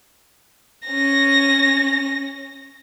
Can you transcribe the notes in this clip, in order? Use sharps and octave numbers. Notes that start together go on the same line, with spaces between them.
C#4 A#6